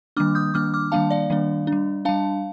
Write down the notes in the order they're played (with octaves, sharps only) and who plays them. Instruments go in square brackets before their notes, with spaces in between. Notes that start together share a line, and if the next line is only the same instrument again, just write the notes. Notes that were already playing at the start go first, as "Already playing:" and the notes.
[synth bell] D#3 G3 A#3 D4 D6 F6
D#6 G6
D#3 G3 A#3 D4 D6 F6
D6 F6
D#3 G3 A#3 D4 F5 A5
D5 F5
D#3 G3 A#3 D4
D4
G3
G3 D4 F5 A5